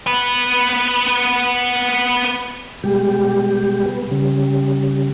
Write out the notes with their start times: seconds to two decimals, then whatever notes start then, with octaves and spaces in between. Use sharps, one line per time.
0.06 B3 B4
2.84 B2 G3 G#3 G4
3.86 B3
4.11 C#3 G3